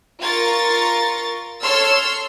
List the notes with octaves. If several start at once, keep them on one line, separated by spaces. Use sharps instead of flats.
F4 A#4 C#6 A6
A4 C#5 C6 E6 F6